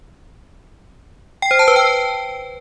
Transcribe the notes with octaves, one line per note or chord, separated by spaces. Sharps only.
G5
C5
A5
B4
G5